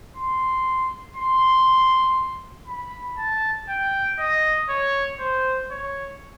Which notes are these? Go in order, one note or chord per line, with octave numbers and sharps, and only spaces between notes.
C6
C6
B5
A5
G5
D#5
C#5
C5
C#5